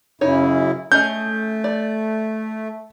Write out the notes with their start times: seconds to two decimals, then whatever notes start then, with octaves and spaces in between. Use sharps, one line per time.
0.21 F#2 C#3 D#4 E4 C#5
0.92 A3 C#4 G#4 D#5 G6
1.64 D5